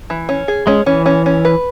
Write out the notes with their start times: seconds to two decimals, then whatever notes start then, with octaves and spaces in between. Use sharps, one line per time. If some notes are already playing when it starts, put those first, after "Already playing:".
0.10 E3
0.29 C#4
0.48 G#4
0.67 G#3 C#4
0.86 E3 C#4
1.06 C#4
1.26 C#4
1.45 B4